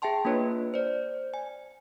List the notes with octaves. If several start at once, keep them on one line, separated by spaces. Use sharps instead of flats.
G#4 E5 G5 A5 C6
A#3 D4 F4 B4 C#5
C5 D5
G#5